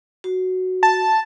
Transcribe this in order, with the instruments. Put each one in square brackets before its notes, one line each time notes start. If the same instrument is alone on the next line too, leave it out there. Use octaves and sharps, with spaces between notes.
[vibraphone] F#4
[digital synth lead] A5